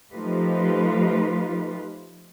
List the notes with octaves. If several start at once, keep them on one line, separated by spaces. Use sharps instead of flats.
F3 A3 D#4 F4 G4 B4